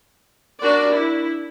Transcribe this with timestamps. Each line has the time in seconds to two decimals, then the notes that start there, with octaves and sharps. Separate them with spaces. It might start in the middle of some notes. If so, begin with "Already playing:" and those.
0.60 D4 F#4 A#4 D5
0.91 E4